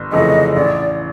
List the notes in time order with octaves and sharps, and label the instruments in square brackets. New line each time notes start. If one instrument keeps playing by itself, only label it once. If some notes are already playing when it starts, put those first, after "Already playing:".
Already playing: [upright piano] G1
[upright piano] F2 C#3 E3 A3 [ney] D#5
[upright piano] A1 [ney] D5